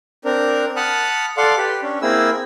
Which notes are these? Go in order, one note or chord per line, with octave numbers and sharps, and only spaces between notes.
C4 D4 A#4
F#5 A5 B5 D#6 F6
A4 D5 F5 F#5 C6
G4 B4
C#4 D4
A#3 C4 E4 G#4 E6